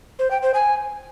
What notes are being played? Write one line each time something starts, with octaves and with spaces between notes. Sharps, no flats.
C5
G5
C5
G#5